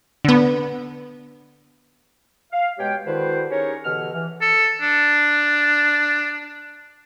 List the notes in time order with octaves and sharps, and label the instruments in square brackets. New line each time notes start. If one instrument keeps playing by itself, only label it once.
[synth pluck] D3 B3
[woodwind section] F5
B2 G#3 G4 C#5 G5
D3 D#3 E4 F#4 B4 C5
C#4 D#4 G4 G#4 A#4 C#5
B2 D3 E3 G4 F6
E3
[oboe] A4
D4